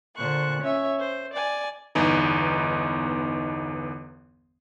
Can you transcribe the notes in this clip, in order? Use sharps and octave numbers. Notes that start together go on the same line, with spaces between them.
A#2 D3 C5 C#6 F#6
C#4 C#5 E5
C5
D5 G#5
G1 E2 B3 D#4